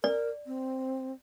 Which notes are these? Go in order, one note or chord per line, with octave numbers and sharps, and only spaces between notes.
A#4 D5
C4